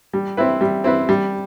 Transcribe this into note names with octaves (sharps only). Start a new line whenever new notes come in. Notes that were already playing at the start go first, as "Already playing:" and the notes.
G3
C4 E4 B4
G3
C4 E4 B4
G3